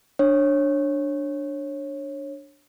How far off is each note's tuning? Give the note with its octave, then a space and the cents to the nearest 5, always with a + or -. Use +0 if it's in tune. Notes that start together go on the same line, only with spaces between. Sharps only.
D4 +0 C#5 -20